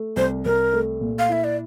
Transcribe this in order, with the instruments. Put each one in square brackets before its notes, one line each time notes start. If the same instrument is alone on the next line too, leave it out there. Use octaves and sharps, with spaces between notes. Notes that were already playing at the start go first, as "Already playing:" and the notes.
Already playing: [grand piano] A3
[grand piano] C2 [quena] C5
[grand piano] C2 [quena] A#4
[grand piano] A3
A#2
[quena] F5
[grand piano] E4 [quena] E5
[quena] D5